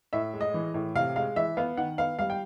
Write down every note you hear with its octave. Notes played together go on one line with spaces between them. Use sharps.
A2 E5
G#3
D#5
E3
A2
C3 F5
G#3 F5
E3 E5
B3 F5
D#3 F#5
B3 F5
G3 F5
G5